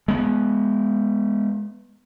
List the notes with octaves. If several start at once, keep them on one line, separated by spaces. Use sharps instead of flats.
G#3 B3